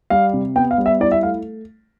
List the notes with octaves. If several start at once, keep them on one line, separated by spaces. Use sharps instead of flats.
G3 F5
C3
B3 G5
F5
G3
E5
E4 D5
E5
A3 F5